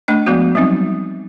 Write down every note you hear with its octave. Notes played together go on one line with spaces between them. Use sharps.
A3 D4 D#5
F3 G#3 B3 F#4
F#3 G3 C4 D#4